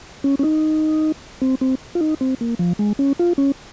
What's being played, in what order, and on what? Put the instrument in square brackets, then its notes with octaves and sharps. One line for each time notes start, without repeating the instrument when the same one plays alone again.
[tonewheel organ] C#4
C#4
D#4
C4
C4
F4
D#4
C4
A#3
F3
G#3
C#4
F4
C#4